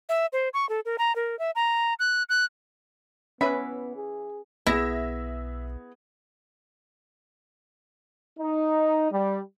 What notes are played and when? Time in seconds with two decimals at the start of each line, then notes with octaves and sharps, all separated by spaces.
0.09 E5
0.33 C5
0.54 C#6
0.69 A4
0.85 A#4
0.98 A#5
1.16 A#4
1.39 E5
1.55 A#5
1.99 F#6
2.29 F#6
3.41 E3 B3 C#4 B4 E5 B5
3.96 G#4
4.67 B1 B3 E4 G#4 E5 A#6 E7
8.39 D#4
9.11 G3